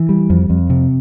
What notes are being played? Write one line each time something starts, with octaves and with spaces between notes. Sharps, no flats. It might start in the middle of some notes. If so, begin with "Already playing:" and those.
Already playing: E3
G3
F2
F2
C3